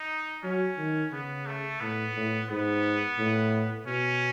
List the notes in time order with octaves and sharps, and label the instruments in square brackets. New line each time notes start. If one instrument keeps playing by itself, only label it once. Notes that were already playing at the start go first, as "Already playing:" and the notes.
Already playing: [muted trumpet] D#4
[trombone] F#3 [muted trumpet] C#4
[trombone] D#3
[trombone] C#3 [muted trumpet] B3
[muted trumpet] A3
[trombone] A2 [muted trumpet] B3
[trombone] A2
[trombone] G#2 [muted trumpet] B3
[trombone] A2
[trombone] B2 [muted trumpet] C#4